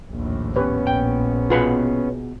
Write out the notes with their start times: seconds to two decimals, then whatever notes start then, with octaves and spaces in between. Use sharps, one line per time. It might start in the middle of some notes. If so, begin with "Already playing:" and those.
0.11 A#1 D#2 A2
0.56 B3 C#4 G4 B4 C#5
0.87 A#1 G5
1.50 B2 F4 G#4 B4 F#5 B5